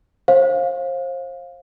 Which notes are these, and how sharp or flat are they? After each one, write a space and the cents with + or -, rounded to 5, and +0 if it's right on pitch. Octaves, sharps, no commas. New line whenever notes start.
C5 +35 F5 +10